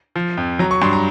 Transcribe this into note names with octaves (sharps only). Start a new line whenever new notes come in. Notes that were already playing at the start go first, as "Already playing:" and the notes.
F3
F2
F#3 A#5
C#6
G2 C6
A#5